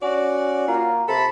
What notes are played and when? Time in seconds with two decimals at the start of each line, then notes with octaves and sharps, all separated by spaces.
0.02 C#4 F#4 D5
0.68 A#3 F4
1.08 C3 A4 A5 B5